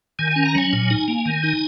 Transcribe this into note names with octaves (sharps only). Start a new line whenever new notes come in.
D#3 G#5
C#4 G#5
A#5
F#3 G#5
A#2
D#4
A#3
D#3
D#4